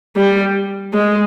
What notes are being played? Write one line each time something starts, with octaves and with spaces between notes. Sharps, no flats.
G3
G#3